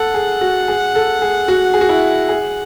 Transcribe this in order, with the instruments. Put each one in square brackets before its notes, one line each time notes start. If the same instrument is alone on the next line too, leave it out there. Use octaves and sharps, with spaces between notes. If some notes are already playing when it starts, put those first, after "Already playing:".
Already playing: [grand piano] A4 [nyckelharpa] F#5
[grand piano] G#4
F#4
G#4
A4
G#4
F#4
G#4
F#4
E4
G#4